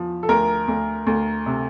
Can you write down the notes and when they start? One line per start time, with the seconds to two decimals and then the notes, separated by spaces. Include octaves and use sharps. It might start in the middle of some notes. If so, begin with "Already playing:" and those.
Already playing: E2 F3
0.23 A4
0.29 D2 A#4
0.68 D2
1.07 D2
1.46 C3